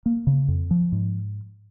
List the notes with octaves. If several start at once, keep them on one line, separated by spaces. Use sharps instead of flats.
A#3
C#3
F2
F3
G#2